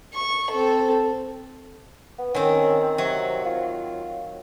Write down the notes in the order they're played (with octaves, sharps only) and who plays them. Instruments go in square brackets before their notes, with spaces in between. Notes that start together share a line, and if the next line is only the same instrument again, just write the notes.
[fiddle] C#6
C4 A4
[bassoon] B3
[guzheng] D#3 C4 [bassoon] C#4
[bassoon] C3 [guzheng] F#3
[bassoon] F4